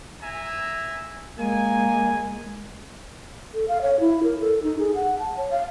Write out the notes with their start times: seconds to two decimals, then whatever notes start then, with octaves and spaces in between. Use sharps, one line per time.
0.22 E5 G#5 A#5
1.39 G#3 A#3 G#5
3.54 A4
3.68 F5
3.82 C#5
4.00 E4
4.23 A#4
4.40 A4
4.63 D#4
4.79 G#4
4.95 F#5
5.20 A5
5.37 C#5
5.51 F5